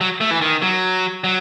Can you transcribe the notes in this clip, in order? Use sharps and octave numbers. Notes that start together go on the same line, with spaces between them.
F#3
A3
E3
D#3
F#3
F#3